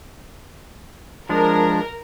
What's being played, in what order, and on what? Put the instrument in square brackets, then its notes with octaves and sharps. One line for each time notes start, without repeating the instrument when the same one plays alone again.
[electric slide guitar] F3 G#3 D4 [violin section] A#4